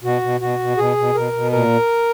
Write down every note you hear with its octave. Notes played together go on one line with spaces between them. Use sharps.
B2 F#4
B2
B2 F#4
B2
B2 G#4
B2
B2 A#4
B2
A#2 A#4